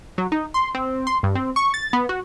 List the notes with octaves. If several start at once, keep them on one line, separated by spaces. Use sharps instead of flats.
F#3
D#4
C6
C4
C6
G2
C4
C#6
A6
B3
F#4